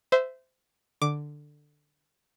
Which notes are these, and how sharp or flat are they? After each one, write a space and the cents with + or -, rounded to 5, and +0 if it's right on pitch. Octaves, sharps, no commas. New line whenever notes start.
C5 -20 E5 +0
D3 +10 D6 +0